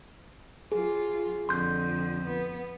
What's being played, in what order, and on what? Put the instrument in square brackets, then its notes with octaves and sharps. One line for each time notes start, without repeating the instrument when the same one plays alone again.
[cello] F#3 F4 [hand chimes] G#4
[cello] F2 D3 [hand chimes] C6 G6
[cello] B3